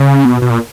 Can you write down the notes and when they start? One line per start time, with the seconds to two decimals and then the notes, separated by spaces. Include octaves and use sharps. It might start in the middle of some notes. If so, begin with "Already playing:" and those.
Already playing: C#3
0.25 B2
0.42 B2
0.50 A#2